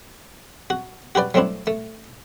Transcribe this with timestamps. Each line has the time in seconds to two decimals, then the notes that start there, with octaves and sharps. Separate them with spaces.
0.70 F#4
1.15 F#4 G4 B4 D5
1.34 F#3 A3 C4 D4 E4
1.67 A3